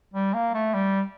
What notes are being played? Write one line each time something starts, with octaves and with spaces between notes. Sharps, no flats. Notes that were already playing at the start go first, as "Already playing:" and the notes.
G3
A#3
A3
G3